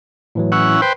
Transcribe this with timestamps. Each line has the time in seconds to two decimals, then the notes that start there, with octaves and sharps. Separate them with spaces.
0.35 A2 E3 F#3
0.52 C#4 E4 F#5
0.82 B4 C5 G5